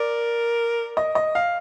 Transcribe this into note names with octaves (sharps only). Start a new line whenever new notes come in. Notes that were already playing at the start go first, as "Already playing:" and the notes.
Already playing: A#4 D5
D#5
D#5
F5